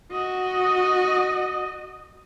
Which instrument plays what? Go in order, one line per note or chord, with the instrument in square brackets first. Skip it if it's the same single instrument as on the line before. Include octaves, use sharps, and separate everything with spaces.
[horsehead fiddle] F#4 D#5